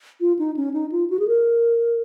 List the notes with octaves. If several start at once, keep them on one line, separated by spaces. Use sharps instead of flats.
F4
D#4
C#4
D#4
F4
F#4
G#4
A#4